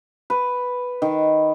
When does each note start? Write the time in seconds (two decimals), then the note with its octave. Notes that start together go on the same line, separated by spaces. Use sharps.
0.30 B4
1.02 D#3